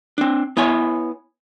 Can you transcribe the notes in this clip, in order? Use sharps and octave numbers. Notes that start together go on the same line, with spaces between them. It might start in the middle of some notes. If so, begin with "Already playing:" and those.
C4 D4
B3 E4 C#5 G#5